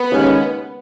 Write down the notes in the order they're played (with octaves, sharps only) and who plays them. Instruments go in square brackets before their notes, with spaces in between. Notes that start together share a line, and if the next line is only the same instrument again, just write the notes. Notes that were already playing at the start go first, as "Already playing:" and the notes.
Already playing: [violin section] B3
[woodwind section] D#2 C#3 G#3 C#4